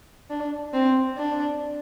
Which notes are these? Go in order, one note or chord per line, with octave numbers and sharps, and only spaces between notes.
D4
C4
D4